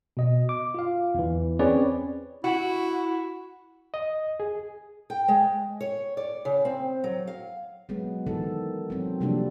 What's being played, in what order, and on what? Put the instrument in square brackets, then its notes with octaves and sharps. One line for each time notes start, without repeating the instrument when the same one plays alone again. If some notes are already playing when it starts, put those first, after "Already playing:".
[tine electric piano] B2 D#5
D6
F4 F5
E2 E3
C4 C#4 G#4 B4 C#5 D5
[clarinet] E4 [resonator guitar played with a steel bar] F#4
[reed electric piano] D#5
G#4
[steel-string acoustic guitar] G5
G#3
C#5
D5
C#3
C4
F#3
F5
[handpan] F#3 G#3 B3
D#3 E3 A4
F#3 C4
C3 F3 G3 A#3 D4